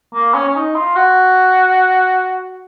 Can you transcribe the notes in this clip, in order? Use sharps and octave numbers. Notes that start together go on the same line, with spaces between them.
A#3
C#4
C#4
D#4
F4
F#4